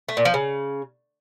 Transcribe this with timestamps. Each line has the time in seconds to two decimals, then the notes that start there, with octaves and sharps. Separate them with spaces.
0.09 A3
0.17 A#2
0.25 F3
0.34 C#3